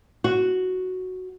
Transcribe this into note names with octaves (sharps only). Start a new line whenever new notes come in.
F#4